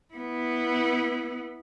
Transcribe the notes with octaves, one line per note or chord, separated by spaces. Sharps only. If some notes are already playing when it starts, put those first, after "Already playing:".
B3 E4